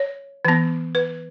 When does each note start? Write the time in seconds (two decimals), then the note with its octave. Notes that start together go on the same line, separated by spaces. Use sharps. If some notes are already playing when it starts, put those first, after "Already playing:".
Already playing: C#5
0.45 E3 B3
0.95 B4